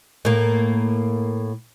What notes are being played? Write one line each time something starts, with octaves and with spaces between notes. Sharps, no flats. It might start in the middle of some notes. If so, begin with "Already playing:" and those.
A2 A#3